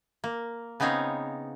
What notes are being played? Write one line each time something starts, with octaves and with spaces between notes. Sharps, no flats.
A#3
C#3 B3 C4 D#4 C#5 F5